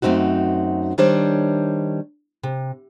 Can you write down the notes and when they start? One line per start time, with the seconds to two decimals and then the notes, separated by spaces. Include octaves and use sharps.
0.02 F#2 A3 C4 D#4 F#4
0.98 D#3 G3 D4 C5 C#5
2.43 C3